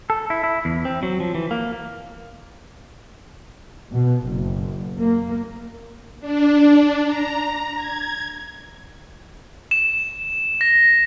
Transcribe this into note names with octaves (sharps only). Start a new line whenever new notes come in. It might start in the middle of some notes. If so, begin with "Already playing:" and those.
A4
E4
E4
E2
C4
F#3
F3
E3
A#3
B2
F#1
A#3
D4
A#5
G#6
E7
A#6